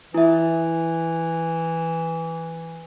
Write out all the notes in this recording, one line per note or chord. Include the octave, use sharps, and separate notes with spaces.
E3 E4 E5